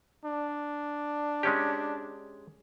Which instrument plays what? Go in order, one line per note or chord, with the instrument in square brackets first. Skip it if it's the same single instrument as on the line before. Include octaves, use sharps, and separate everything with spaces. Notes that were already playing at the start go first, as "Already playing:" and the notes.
[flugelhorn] D4
[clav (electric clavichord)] G#3 C#4 G4